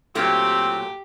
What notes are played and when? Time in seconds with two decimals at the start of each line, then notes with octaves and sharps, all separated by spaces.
0.15 A#2 F#3 A3 C4 G4